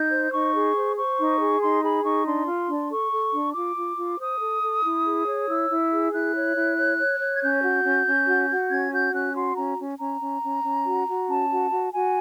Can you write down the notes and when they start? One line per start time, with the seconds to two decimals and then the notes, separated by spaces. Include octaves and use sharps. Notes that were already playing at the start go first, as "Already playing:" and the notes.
Already playing: D#4 G6
0.11 C5
0.32 D#4 C#6
0.54 G#4
0.75 C5
0.97 C5 C#6
1.18 D#4
1.39 G#4
1.61 D#4 C6
1.82 G#4 B5
2.04 D#4 C#6
2.25 D4 C6
2.47 F4
2.69 D4
2.90 A4 C#6
3.12 A4
3.33 D4
3.54 F4 D6
3.76 F4
3.98 F4
4.19 C5 D#6
4.40 A4
4.62 A4
4.84 E4
5.05 G#4
5.27 C#5
5.48 E4 E6
5.69 E4
5.91 G#4
6.12 E4 F#6
6.34 C#5
6.56 E4
6.77 C#5
6.98 C#5
7.20 C#5
7.35 G#6
7.41 C#4 G6
7.63 F#4
7.84 C#4
8.06 C#4
8.27 F#4
8.49 F#4
8.70 C#4 G#6
8.92 F#4 G6
9.13 C#4 F#6
9.35 F#4 C6
9.56 C#4 A#5
9.78 C#4
9.99 C#4 A#5
10.21 C#4
10.43 C#4
10.64 C#4
10.85 F#4
11.07 F#4
11.28 C#4 A5
11.50 F#4
11.71 F#4
11.93 F#4 G#5